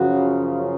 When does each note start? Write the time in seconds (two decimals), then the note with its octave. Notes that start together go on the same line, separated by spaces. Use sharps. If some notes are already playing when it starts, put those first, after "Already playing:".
Already playing: F#2 C#3 F3 F#4